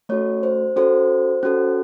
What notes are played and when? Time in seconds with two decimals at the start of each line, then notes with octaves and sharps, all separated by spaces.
0.09 A3 C#4 F#4 A4 C#5
0.43 C5
0.76 C#4 F#4 A4 C5
1.43 C#4 F#4 A4